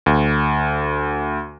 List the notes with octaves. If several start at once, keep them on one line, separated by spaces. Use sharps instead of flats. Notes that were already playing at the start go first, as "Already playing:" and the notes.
D2